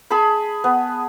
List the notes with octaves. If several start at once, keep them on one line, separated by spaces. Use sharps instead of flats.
G#4 A5 B5
B3